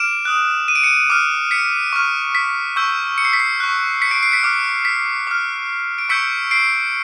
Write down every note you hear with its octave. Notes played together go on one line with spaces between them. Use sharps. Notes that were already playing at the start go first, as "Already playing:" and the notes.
Already playing: D6 F6 D7 E7
D#6 F#6
D#7
D7
C#7 D#7
D6 F6
B6 C#7
C#6 F6
B6
C#6 E6 G6
C#7
C7
B6
C7
C#6 F#6
B6 C#7
C7 D7
C7 D7
B6 C#7
D6 F6
B6
D6 F6
D7
C#6 E6 G6 B6 C#7
C7 D7